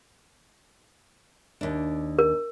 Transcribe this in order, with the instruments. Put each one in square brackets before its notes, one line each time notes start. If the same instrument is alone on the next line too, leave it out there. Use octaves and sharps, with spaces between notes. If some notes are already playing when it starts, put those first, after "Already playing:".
[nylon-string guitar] D#2 D4
[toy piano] A#4